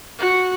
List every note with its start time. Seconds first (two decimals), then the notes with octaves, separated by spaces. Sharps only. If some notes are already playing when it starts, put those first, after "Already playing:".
0.19 F#4